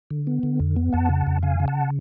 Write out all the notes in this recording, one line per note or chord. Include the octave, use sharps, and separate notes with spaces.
D3
B3
D3
F2
B3
F2 F#5 A5
C#3
F2
C#3 F5 G#5
C#3
F#5 A5